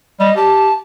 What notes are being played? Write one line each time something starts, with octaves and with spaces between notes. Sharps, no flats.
G3 D#5
G4 A5